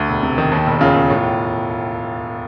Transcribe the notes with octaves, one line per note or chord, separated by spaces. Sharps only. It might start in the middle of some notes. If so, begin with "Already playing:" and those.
Already playing: D2
E1
C3
D#3
D#2
E1
C#3 F4
E1
A2